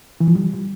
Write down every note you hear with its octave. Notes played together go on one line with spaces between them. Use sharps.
E3
F3
G3